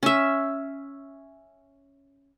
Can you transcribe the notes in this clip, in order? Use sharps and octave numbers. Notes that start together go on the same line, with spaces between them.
C#4 E5